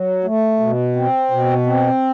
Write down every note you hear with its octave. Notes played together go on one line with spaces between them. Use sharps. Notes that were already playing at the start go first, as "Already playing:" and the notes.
Already playing: F#3
A3
B2
C4
B2
C4